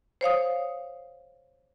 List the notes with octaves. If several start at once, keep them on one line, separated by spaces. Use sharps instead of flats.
C5 C#5 F5 D#6